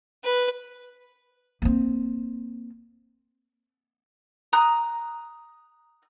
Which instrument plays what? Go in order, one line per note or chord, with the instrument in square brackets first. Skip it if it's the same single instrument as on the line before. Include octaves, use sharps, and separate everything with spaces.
[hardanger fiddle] B4
[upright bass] A#3 C4
[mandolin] A#5 D#6 F#6